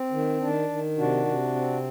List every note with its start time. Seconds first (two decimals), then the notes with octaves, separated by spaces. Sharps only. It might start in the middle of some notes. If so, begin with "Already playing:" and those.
Already playing: C4
0.12 D#3
0.40 D#3 D4
0.69 D#3
0.98 C3 D4 F#4
1.25 C3
1.55 C4